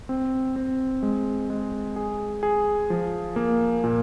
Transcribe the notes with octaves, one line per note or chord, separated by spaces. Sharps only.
C4
C4
G#3
G#3
G#4
G#4
F3
A#3
A#2